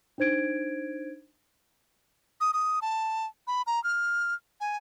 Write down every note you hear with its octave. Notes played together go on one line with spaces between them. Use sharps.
D4 D#4 C5 G#6 D7
D#6
D#6
A5
B5
A#5
F6
G#5